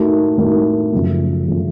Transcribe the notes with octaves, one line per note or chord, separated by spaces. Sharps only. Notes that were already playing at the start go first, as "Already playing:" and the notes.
Already playing: A2 A3 D#4 F#4 A#4
A2 A3 D#4 F#4 A#4
F#2 C#3 F3 A3
C#3 F3 A3